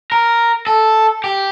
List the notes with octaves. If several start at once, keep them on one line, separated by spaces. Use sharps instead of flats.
A#4
A4
G4